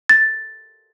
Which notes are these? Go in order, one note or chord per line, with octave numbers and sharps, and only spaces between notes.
A6